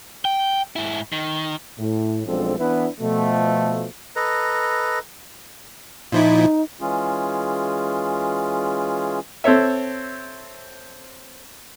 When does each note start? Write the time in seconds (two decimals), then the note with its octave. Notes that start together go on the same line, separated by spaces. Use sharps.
0.25 G5
0.76 G#2 E4
1.12 D#3
1.78 A2
2.27 B1 F3 G#3 C4 D4 A4
2.58 E3 B3 D4 E4 B4
3.01 B2 F3 A3
4.16 A4 B4 D#5 A#5
6.12 A#2 F3 D#4 E4
6.81 E3 G#3 C#4 F4 G#4
9.44 C4 A4 C#5 E5